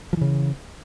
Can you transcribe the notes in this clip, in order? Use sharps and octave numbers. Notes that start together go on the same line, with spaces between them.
C#3 E3 F3